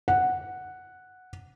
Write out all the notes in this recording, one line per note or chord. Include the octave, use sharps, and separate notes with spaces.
F#5